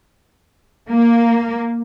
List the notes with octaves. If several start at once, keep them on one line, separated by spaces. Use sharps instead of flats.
A#3